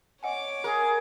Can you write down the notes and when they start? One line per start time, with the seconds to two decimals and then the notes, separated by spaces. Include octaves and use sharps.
0.23 C#5 D#5 F#5 G#5 D6
0.64 G#4 A#4